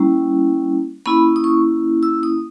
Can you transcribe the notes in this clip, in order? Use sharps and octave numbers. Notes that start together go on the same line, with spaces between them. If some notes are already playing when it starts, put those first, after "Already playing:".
Already playing: G3 A#3 C#4 E4
A#3 C#4 E4 B5
D#6
C#6
E6
D#6